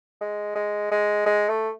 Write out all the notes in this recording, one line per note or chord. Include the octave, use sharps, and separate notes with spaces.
G#3
G#3
G#3
G#3
A3